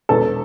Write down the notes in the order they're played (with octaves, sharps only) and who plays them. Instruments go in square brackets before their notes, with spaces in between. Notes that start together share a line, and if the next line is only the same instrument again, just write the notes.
[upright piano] E1 E2 E3 A4